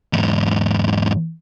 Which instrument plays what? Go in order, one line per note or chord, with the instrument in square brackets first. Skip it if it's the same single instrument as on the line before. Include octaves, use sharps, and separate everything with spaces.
[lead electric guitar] E2 G#2